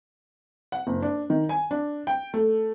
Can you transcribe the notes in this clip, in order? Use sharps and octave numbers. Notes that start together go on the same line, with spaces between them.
F#5
F#1
D4
D#3
G#5
D4
G5
A3